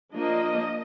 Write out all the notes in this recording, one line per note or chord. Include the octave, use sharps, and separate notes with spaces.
F3 A#3 D4 D#5